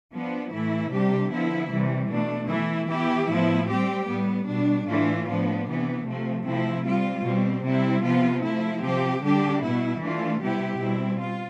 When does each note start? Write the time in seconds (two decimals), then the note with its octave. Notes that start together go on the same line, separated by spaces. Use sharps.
0.12 F3 B3 D4
0.52 A2 E3 A3 E4
0.91 C3 G3 D4 G4
1.31 D3 F3 B3 E4
1.71 C3 E3 G3
2.10 B2 A3 D4
2.50 E3 A3 E4
2.89 E3 B3 E4 G4
3.29 A2 F3 B3 E4
3.69 G3 C4 G4
4.07 A2 G3 B3
4.48 B2 G3 D4
4.87 A2 E3 A3 D4 F4
5.27 A2 F3 B3 D4
5.66 C3 E3 B3
6.06 C3 F3 A3
6.45 C3 F3 A3 C4 E4
6.85 G3 C4 F4
7.25 B2 G3 C4
7.64 C3 G3 C4 E4
8.03 C3 F3 B3 F4
8.42 F3 A3 E4
8.83 C3 F3 C4 G4
9.22 D3 G3 D4 G4
9.61 B2 B3 E4
10.01 E3 A3 D4 F4
10.40 C3 G3 B3 E4 G4
10.80 B2 G3 C4 E4
11.20 F4